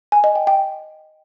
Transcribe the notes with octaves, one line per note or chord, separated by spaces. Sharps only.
G#5
D#5
G5
G5